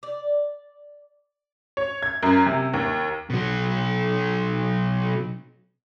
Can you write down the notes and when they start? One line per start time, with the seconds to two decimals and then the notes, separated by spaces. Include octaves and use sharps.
0.03 D5
1.77 C#5
2.02 G#6
2.23 F#2
2.46 C3
2.74 D#2
3.30 B2 F#3